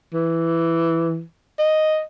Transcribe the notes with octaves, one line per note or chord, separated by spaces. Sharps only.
E3
D#5